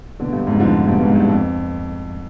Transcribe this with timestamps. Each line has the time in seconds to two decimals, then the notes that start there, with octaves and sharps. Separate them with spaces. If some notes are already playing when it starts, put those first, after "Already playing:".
0.20 B2 D3
0.33 G2
0.47 F2 G#2
0.60 D3 F3
0.87 G2 B2
1.01 F2 G#2
1.15 G2
1.29 F2